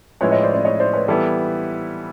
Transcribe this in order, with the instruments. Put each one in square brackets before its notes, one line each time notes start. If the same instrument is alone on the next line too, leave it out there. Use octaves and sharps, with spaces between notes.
[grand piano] A2 F3 G#3 C#4 E4 [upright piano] B4 C#5
[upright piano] C#5 D#5
C5 D5
C5 D5
C#5 D#5
C5 D5
B4 C#5
[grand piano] E3 G3 B3 E4 [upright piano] A4 B4